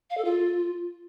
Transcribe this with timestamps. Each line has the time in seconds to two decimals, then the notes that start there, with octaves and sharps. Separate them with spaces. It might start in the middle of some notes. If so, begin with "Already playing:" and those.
0.10 F5
0.17 A4
0.24 F4